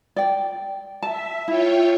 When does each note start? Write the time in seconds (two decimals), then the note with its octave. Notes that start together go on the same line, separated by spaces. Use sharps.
0.16 D5 G5
1.03 E5 A5
1.48 E4 F4 C#5 G5